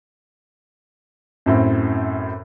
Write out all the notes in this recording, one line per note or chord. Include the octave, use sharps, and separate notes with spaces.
F#2 A2 C4